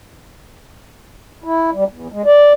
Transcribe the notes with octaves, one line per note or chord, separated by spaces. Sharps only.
E4
G3
E2
G#3
D5